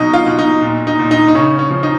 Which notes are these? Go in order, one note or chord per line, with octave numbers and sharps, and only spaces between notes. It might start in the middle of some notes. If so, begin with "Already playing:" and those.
Already playing: B2 F#3 D#4
F4
B2
D#4
A#2
D#4
A#2
D#4
D#4
C#3 C#4
C#4
F3
D#4